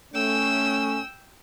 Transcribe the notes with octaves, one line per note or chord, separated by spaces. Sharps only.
A3 C#4 G5 E6